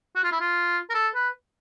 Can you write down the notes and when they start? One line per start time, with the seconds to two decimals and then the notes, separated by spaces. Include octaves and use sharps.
0.16 F#4
0.24 F4
0.32 E4
0.40 F4
0.90 A#4
0.94 A4
1.15 B4